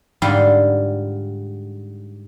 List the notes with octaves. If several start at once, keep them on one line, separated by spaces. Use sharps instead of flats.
G#2 D3 G3 F4 F#5 C6